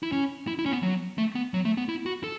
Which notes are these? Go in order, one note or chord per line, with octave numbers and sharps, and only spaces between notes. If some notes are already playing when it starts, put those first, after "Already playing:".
E4
C#4
E4
E4
C#4
B3
F#3
A3
B3
F#3
A3
B3
E4
F#4
A4